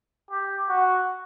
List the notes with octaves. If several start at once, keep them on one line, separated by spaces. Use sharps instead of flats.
G4
F#4